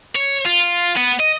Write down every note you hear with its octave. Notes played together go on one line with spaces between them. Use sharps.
C#5
F4
B3
D#5